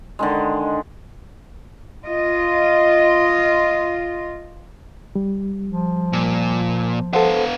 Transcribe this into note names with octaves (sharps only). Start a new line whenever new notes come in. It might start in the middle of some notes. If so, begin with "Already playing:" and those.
D3 D#3 G#3
F4 D#5
G3
F3
A#2
B3 A4 C5 F5 F#5